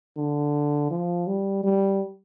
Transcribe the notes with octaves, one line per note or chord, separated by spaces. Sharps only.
D3
F3
G3
G3